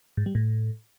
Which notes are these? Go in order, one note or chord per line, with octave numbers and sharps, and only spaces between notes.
G#2
G3
A2